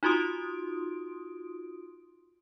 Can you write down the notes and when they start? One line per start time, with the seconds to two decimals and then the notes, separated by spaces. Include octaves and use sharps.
0.03 D#4 F4 F#4 C6 D#6 D7